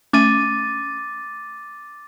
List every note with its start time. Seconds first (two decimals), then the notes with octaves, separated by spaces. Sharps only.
0.13 A3 C#4 D6 A6 D#7